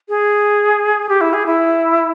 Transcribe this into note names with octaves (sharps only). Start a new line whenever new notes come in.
G#4
G4
E4
G#4
E4